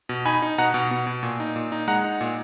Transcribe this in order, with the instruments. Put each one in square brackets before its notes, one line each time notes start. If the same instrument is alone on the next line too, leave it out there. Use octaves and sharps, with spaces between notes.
[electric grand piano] B2
D#4 G#5 B5
D#4
B2 F#5 A#5
B2
B2
B2
A#2
D#4
A#2
D#4
G#3 F#5 A#5
D#4
A#2